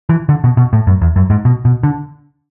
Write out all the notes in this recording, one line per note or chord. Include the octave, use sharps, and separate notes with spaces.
E3
D3
B2
B2
A2
F#2
E2
F#2
G#2
B2
B2
D3